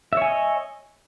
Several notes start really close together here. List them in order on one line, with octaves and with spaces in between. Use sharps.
E5 C#5 G#5 D#5